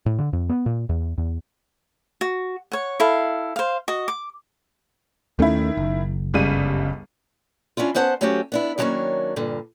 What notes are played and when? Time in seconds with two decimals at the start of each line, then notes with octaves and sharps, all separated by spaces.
0.06 A2
0.19 D3
0.33 F2
0.49 B3
0.66 A#2
0.89 E2
1.18 E2
2.21 F#4
2.72 C#5 F#5
3.00 E4 A4 F5
3.56 C5 F5
3.88 F#4 D#5
4.08 D6
5.39 D#2 D#3 A3 C#4 E4
5.77 F#1
6.34 G1 C#2 C#3 G3 D#7
7.77 C#4 D4 E4 F4
7.95 B3 C#4 C5 F#5 G5 A5
8.21 F#3 A3 C4 C#4 F#4 G4
8.52 B3 D4 E4
8.78 D#3 F#3 G3 A#3 C#4 D4
9.36 G2 A#2 D3